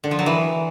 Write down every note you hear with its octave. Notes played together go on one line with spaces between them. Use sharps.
D3
F3
F#3
E3